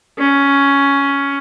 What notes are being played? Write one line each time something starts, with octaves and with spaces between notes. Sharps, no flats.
C#4